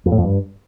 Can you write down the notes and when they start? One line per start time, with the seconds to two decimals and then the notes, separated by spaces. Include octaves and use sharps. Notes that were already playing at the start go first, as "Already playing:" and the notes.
0.06 F2
0.12 A2
0.18 F2
0.24 G2